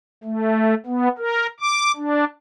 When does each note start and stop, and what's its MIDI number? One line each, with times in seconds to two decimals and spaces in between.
0.24 0.74 57
0.86 1.08 59
1.18 1.46 70
1.60 1.92 86
1.96 2.25 62